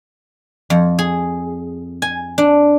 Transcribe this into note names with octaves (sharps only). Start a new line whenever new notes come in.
F2
G#4
G#5
D4